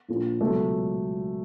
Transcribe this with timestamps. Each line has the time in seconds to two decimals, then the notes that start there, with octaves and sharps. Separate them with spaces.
0.09 A#1 A#2 F3
0.41 C#2 B2 F#3 A3